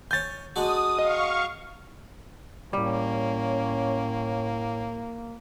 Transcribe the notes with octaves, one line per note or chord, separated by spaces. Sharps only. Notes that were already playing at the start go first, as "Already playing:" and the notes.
C#5 G#5 G6 A6
G#3 D4 F#4 D#6
D#5 F5 C#6
A2 G3 A#3 C#4